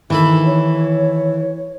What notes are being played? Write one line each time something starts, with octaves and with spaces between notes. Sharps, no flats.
D#2 E3 D#4 A4 B5
C#5